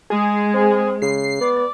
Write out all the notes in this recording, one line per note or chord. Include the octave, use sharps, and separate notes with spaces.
G#3 G#4
C4
C#3 C7
B3 D5